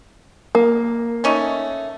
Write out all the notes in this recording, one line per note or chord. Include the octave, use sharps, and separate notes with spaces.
A#3
A3 C#4 D#4